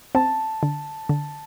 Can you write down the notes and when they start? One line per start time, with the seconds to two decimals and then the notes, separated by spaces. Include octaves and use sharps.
0.15 C4 A5
0.63 D3
1.09 D3